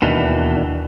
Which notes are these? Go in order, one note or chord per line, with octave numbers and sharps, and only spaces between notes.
D#2 B2 D#3 E3 D4